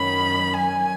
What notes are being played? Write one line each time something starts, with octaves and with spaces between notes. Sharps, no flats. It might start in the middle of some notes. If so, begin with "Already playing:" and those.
Already playing: F#2 D#3 F#3 C#4 B5
G#5